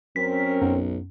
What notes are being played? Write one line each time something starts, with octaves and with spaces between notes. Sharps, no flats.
F#2 C4 C#4 A#4 B6
B1 F#2